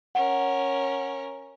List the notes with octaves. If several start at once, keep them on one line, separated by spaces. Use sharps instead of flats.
C#4 A#4 F#5